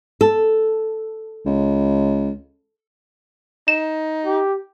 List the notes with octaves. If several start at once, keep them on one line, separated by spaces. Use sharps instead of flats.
A4
C#2
D#4 E7
G4